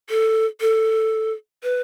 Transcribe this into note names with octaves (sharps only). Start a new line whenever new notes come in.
A4
A4
B4